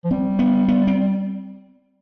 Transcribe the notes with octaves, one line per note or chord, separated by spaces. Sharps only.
F3
G3 C4
B3
B3
C4